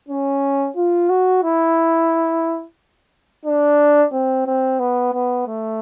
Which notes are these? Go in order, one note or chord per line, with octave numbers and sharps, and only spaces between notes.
C#4
F4
F#4
E4
D4
C4
C4
B3
B3
A3